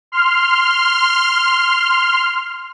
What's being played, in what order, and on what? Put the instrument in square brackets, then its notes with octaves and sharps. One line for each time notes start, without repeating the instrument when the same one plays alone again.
[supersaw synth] C6 F6